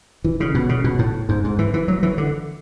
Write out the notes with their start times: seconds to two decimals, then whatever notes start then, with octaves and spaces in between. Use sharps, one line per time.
0.24 E3
0.40 C#3
0.55 B2
0.69 C#3
0.84 B2
0.99 A2
1.29 G#2
1.44 G#2
1.59 E3
1.74 E3
1.88 F#3
2.03 E3
2.18 D3